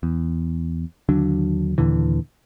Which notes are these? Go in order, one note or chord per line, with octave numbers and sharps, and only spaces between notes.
E2
D#2 D3 F#3 D4
D#2 A#2 D3 E3